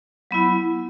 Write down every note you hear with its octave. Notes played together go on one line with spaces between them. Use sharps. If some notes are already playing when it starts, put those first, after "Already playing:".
F#3 B3 E4